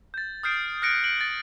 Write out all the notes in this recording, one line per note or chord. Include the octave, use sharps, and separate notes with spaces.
G6 A6
D#6 F6 G6 C7 D7
F6 F#6 A#6 C#7 D7
D7 F#7
A6